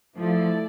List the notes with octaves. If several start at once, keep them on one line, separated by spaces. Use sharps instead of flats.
F3 A3 E4 A4 D5